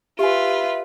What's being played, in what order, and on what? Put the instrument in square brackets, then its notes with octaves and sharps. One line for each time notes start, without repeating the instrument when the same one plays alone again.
[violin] F4 B4 [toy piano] G4 G#5 [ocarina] E5